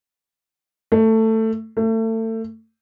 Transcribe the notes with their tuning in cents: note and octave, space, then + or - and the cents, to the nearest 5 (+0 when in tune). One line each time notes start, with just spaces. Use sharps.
A3 +15
A3 +30